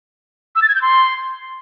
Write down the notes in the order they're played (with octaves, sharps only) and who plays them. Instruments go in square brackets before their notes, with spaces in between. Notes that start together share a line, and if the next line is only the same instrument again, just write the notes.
[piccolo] E6
A6
G#6
G6
C6